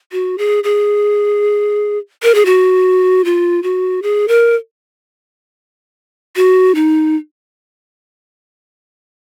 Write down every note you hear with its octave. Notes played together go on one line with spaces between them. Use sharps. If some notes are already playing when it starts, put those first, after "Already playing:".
F#4
G#4
G#4
A#4
G#4
F#4
F4
F#4
G#4
A#4
F#4
D#4